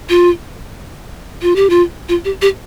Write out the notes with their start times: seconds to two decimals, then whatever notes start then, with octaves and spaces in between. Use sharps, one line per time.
0.10 F4
1.42 F4
1.56 G4
1.70 F4
2.09 F4
2.25 G4
2.42 G4